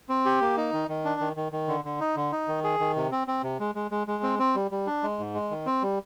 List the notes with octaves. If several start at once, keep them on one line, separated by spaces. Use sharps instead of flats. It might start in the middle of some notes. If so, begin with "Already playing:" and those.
C4
G4
A#3
D#4
D#3
D#3
D4
D#3
D#3
D#3
D3
D3
D#4
D3
D#4
D#3
G#4
D#3
C3
C4
C4
C3
G#3
G#3
G#3
G#3
C4
C4
G3
G3
D4
G#3
G#2
G#3
D#3
C4
G3